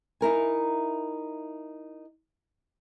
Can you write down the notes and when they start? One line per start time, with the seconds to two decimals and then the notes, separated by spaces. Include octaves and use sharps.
0.21 D#4 E4 A#4 G#5